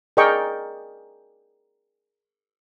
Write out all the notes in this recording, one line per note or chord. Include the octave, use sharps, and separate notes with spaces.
G#4 A#4 D5 D#5 G5 C#6